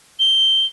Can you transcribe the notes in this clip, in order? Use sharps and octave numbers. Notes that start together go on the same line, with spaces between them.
G7